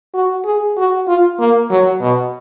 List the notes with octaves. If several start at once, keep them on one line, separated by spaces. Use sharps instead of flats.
F#4
G#4
F#4
F4
A#3
F#3
B2